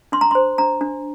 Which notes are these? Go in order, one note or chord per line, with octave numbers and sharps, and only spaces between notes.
D4 C6
A#5
C5 C6
D4 A#5
D4